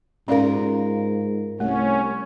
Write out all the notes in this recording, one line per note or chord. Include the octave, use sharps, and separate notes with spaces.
G#2 C#4 F4 A#4 D5 F5
C2 A3 C#4